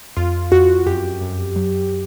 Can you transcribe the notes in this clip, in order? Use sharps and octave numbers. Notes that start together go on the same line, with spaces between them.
F2 F4
F2 F#4
F#2 G4
F#2
F#3